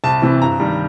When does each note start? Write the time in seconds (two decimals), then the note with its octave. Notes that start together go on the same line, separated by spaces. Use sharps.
0.04 C2 A5
0.22 C3 E3
0.42 G2 A#5
0.60 D#3 G3